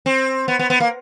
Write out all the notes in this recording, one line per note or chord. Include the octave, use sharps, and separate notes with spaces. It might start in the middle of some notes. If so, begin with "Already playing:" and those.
C4
B3
B3
B3
A#3